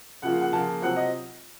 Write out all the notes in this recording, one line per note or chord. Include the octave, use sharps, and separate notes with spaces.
C#3 F3 A#3 F4 F#5
F#5
C#3 F3 A#3 F4 A5
C3 F#3 C4 F4 F#5
D#5